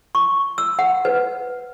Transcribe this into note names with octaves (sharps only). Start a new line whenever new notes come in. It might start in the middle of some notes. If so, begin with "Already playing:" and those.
C#6
E6
F#5
B4